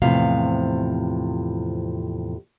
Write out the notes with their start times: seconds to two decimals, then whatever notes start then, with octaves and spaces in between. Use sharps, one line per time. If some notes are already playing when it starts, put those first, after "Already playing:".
0.02 E2 A2 C3 F3 F5